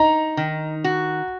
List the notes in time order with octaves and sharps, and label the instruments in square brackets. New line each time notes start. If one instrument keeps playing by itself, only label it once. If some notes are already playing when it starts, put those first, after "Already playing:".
Already playing: [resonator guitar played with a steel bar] D#4 [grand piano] A#5
[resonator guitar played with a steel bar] D#3
F#4